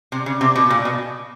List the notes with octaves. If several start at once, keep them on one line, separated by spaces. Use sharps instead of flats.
C3
C#3
C3
B2
A#2
B2